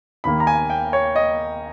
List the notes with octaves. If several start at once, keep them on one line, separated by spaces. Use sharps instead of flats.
D#2 D#3 A#3 B5
A#5
G#5
G5
C#5
D#5